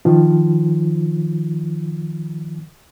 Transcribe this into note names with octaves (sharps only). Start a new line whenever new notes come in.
D#3 F3